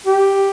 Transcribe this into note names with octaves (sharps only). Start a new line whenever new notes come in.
G4